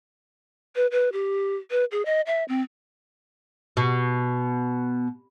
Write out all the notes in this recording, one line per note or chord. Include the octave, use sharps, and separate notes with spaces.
B4
B4
G4
B4
G#4
D#5
E5
C4
B2